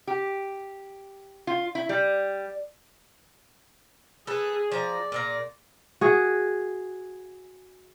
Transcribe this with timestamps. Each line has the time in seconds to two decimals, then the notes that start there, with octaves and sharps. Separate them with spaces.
0.07 G4
1.47 F4
1.75 E4
1.89 G3
4.27 G#4 A4 B4
4.72 F3 D5 A#5
5.12 A#2 F5 A#5
6.01 F#4 G#4